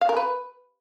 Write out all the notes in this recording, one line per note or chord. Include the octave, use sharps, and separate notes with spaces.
F5
A#4
B4